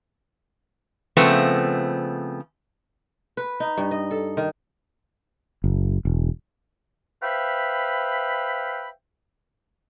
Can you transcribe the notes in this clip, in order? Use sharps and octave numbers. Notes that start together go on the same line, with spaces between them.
C#3 F3 A3 B3 C4
B4
D#4
G2
D#5
A4
D#3
F#1
E1
B4 C5 E5 F5 G5 B5